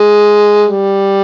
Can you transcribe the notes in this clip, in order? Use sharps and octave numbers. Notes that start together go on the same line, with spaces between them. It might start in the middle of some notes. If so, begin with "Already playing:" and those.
Already playing: G#3
G3